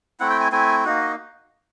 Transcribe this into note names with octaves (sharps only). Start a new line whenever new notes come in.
A3 C4 E4 F#5
G5
G#5
A3 C4 E4 G#5
A#3 D#4 F#4
D#5